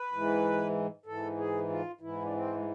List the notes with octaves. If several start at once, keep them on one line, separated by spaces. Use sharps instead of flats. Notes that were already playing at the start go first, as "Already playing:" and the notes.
Already playing: B4
G#2 E3
G#2 E3 A4
G#4
F4
G#2 E3 E4
D4
C4
G#3